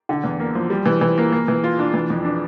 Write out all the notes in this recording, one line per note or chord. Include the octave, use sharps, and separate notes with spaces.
D3
E2
A#3
F3
G3
E3
E3
A#3
A#3
E3
F4
D4
E3
F2
D4